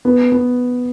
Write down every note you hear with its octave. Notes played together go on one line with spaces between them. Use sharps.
B3
B3